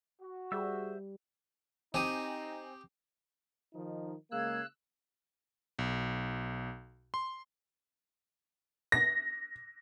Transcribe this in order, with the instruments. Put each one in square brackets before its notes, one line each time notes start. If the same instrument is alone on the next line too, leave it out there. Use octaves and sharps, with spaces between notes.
[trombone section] F#4
[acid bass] G3 [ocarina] G#4 [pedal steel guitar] C5 E5 E6
[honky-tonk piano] C4 G#5 [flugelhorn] D#4 [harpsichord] G4 D#6
[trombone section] D#3 F3 D#4
[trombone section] C#3 G#3 A#3 [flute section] G#4 F5 G#6 [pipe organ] E6 F#6
[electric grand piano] B1
C6
[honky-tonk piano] A#6